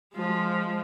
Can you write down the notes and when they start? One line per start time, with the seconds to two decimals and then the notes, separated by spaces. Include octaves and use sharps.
0.13 F3 G#3